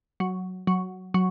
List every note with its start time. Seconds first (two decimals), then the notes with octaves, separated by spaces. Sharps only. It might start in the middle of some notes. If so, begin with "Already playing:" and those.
0.20 F#3
0.67 F#3
1.14 F#3